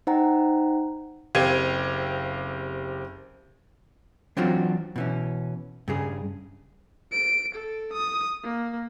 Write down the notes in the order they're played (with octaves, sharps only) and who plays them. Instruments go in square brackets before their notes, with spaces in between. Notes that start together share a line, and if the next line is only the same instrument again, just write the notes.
[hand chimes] D#4 C5 F#5 G5 A#5
[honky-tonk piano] F#1 C4 G4 F5 G#6 D#7
[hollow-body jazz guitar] E3 F#3 C4 D4 F4 F#4
B2 E3 C#4
G2 C#3 G#4
[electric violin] D7
A4
D#6
A#3